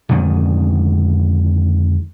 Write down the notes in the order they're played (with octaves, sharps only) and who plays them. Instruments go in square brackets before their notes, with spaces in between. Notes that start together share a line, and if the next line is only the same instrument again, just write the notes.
[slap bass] F2 G#2 D3 D#3